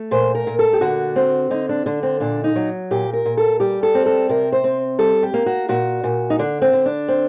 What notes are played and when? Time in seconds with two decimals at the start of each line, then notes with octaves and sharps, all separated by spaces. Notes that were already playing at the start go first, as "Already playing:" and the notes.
Already playing: A3
0.11 A#2 C5
0.35 A#4
0.47 A#2
0.59 A4
0.73 G4
0.81 D3 F#4
1.16 C4
1.50 D3 D#4
1.69 D4
1.86 D3 D4
2.03 C4
2.20 A#2 D4
2.44 D#4
2.56 F#3
2.91 A#2 G4
3.13 A#4
3.25 A#2
3.37 A4
3.60 G3 G4
3.83 A4
3.95 C4
4.06 A4
4.29 C3 A#4
4.52 C5
4.64 C4
4.99 G3 A4
5.23 G4
5.34 A#3
5.46 F#4
5.69 A#2 F#4
6.04 A#2
6.30 D#4
6.39 D3 D4
6.62 C4
6.73 D3
6.86 D4
7.08 C4